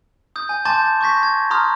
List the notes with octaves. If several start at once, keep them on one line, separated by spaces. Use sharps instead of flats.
D#6 G6
G#5 G6
G#5 A5 C6 D6 G6 A6
C#6 D6 G6 A#6 B6
G#6
A#5 C6 D#6 F6